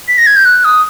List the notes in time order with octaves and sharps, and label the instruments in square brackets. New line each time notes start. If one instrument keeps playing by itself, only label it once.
[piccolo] B6
A#6
G#6
G6
F#6
D#6